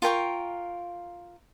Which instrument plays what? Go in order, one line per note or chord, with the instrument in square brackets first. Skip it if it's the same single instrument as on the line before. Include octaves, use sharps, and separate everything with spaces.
[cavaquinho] F4 A#4 G5 C#6